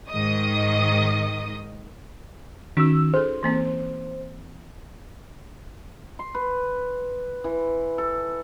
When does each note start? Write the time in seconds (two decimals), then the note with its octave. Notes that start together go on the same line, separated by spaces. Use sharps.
0.10 G#2 D#3 D#5 D#6
2.77 D#3 C#4 D#4 F#4 E6
3.14 G#4 A4 C5
3.43 E3 A#3 C4
6.19 C6
6.34 B4
7.44 E3
7.98 A4